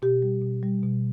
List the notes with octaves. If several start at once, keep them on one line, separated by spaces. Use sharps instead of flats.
B2 G4
G3
B2
G3
B2